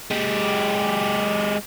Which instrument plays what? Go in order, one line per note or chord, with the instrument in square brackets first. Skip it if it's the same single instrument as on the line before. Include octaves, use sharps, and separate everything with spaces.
[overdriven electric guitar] G#3 G4